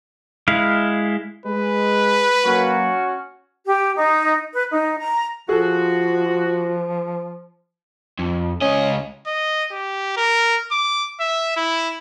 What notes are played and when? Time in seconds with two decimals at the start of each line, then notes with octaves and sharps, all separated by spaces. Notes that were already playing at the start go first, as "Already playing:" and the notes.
0.48 G#3 E4 F5
1.46 G#3 B4
2.45 F#3 A#3 C#4 F#4
3.66 G4
3.96 D#4
4.54 B4
4.71 D#4
4.99 A#5
5.49 F3 F4 F#4 G#4 A4
8.19 F2
8.61 C#2 C#4 D#5
9.27 D#5
9.72 G4
10.17 A#4
10.72 D6
11.20 E5
11.56 E4